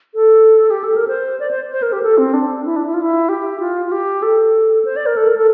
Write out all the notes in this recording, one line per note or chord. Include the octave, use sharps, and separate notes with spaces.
A4
G4
A4
A#4
C5
D5
C5
C5
A#4
G4
A4
C4
D4
E4
D4
E4
F4
E4
G4
F4
F4
G4
A4
C5
D5
A#4
A4
A#4
A4